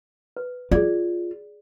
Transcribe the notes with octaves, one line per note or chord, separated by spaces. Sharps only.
B4
F4 G#4 D5